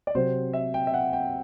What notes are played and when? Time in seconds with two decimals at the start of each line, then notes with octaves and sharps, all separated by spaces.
0.07 D5
0.15 C3 F#3 C4 C5
0.53 E5
0.74 G5
0.87 E5
0.94 F#5
1.13 G5